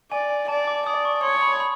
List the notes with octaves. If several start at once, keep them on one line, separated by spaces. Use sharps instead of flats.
D5 G#5
G#5
D5 A5
D6
D5 D#6
C#6
C#5 C6
B5
B5